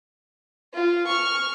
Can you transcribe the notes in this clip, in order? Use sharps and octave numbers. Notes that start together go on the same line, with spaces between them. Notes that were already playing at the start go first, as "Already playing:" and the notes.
F4
C#6 F6